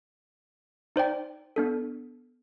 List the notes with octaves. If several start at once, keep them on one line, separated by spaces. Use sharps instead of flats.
D#4 C5 D5 G5
B3 D4 A4